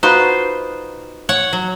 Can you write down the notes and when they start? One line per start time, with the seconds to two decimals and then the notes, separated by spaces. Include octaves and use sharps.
0.03 D#4 F4 F#4 B4 C5
1.29 C#5 F#5
1.53 F#3